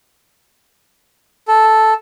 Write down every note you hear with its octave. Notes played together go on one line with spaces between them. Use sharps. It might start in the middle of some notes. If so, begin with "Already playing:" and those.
A4